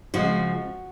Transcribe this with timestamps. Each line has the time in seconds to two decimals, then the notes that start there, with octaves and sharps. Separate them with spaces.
0.14 C#3 F3 G#3 F#4